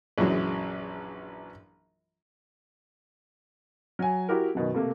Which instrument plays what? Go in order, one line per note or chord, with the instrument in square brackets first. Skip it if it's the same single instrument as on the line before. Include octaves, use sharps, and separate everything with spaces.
[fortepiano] A#1 F#2 E3 F#3 G#3
[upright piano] F#3 G#5
E4 F#4 G4 A#4
F#2 B2 D#3
C3 A3 A#3